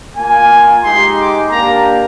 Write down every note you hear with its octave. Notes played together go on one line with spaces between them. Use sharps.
A#3 F4 G#5
G#3 D#4 G4 C6
D6
A#3 D4 G4 A#5